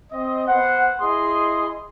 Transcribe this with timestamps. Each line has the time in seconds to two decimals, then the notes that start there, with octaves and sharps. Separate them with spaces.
0.12 C4 D#5
0.47 B3 C5 F#5
1.01 E4 G#4 D#5 C6 D#6